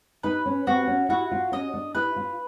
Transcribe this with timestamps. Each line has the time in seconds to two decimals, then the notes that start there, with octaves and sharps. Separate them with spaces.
0.23 D#4 B4
0.46 C#4
0.67 C4 F#4
0.87 C#4
1.09 E4 F#4
1.31 F4
1.52 C#4 D#5
1.74 D4
1.95 E4 B4
2.16 F4